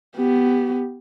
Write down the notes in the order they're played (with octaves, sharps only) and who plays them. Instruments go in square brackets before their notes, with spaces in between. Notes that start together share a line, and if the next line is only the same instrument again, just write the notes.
[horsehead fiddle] B3 G4